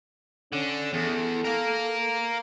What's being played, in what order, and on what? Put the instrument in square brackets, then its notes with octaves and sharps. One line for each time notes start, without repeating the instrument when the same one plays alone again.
[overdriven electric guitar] D3 [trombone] C#4
[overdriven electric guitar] E2 [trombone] A4
[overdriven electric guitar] A#4 F5